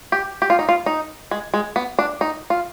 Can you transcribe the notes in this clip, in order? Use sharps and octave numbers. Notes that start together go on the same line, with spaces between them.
G4
G4
F4
D#4
F4
D#4
G#3
G#3
B3
D4
D#4
F4